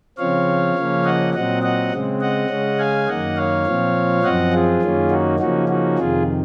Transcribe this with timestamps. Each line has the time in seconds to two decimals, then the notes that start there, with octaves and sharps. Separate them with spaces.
0.18 C#3 F3 C4 C#5 F5
0.76 C#3 F3 A#3 C#4
1.05 D#5 F#5
1.34 A#2 F#3 C4 D#5 F#5
1.63 D#5 F#5
1.92 C#3 G#3 C4
2.21 D#5 F#5
2.50 C#3 G#3 C#4
2.79 F5 G#5
3.08 F#2 D#3 A#3 D#5 F#5
3.37 C#5 F5
3.66 A#2 F3 C4
4.24 F#2 F3 C4 D#5 F#5
4.53 F4 G#4
4.81 F#2 D#3 A#3 C#4
5.11 D#4 F#4
5.39 C#3 F3 A#3 C#4 D#4 F#4
5.69 D#4 F#4
5.98 F2 C3 D#3 F4 G#4